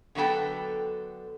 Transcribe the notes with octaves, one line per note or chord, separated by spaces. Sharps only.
D3 F#3 B3 A4 G5